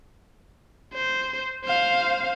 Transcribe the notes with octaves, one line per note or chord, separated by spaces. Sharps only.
C5
C5 F5